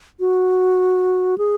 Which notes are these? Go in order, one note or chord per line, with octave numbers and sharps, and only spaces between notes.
F#4
G#4